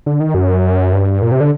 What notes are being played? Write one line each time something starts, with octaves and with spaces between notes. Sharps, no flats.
D3
D#3
F#2
G2
A#2
C3
D3